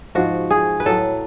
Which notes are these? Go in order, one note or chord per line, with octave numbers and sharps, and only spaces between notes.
G#2 F3 F#4
G#4
B4
A2 F#3 A4